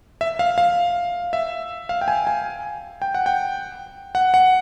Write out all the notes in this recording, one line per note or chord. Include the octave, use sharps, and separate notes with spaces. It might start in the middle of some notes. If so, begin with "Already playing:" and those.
E5
F5
F5
E5
F5
G5
G#5
G#5
G5
F#5
G5
F#5
F#5